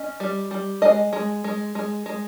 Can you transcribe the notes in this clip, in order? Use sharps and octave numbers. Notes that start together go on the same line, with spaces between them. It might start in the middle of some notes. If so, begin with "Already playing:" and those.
Already playing: C#4 D#5
G3
G3
G#3 D#5
G#3
G#3
G#3
G#3